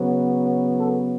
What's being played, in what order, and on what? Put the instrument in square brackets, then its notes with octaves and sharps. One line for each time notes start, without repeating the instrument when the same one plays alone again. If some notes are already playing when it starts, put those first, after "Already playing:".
Already playing: [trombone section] C#3 F#3 B3
A4